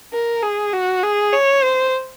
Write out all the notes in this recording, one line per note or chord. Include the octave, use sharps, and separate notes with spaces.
A#4
G#4
F#4
G#4
C#5
C5